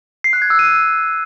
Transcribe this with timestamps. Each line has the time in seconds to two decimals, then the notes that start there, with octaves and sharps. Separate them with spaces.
0.24 C7
0.33 F#6
0.42 G#6
0.50 E6
0.59 D#7